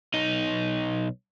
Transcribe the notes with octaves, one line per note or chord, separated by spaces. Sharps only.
B1 D#4